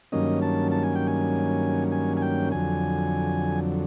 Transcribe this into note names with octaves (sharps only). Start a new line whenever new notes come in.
G2 D#3 F#3 A#3 C#4 D#5
A5
A5
G#5
G5
G#5
G#5
G#5
G5
F2 D3 F#3 G#5